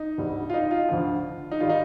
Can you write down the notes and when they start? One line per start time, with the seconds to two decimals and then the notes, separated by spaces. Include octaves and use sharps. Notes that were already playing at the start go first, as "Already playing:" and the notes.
Already playing: D#4
0.18 D2 D3 G3
0.50 F4
0.54 D#4
0.71 F4
0.89 D2 D3 F3
1.51 D#4
1.60 D#3 G3 F4
1.69 D#4